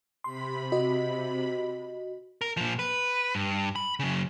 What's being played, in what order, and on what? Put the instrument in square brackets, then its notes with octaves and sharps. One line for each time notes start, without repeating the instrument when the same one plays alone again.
[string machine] C3 B5 [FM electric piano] C6
[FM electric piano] F#4 D#5
[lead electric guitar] A#4
A#2 F3
B4
G2
B5
C#3 F#3